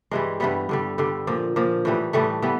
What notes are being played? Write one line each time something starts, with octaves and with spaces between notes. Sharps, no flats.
G2 E3 G3 G#3
G2 E3 G3 B3
G2 D3 G3
G2 D3 G3
A#2 F3
A#2 F3
A2 E3 G3
A2 E3 G3 A3
E3 G3 B3